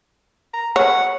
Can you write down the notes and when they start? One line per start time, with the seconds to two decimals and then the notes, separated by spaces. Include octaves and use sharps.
0.54 A#5
0.76 C#5 F#5